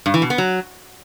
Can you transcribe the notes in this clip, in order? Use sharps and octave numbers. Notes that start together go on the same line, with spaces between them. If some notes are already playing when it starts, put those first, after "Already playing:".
G2
E3
B2
B3
F#3